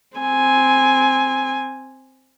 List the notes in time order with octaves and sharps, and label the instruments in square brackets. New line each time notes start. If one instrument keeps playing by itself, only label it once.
[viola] C4 G#5